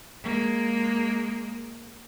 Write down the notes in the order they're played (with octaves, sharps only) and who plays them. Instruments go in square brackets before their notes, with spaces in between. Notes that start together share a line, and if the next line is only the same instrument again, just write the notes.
[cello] G#3 A#3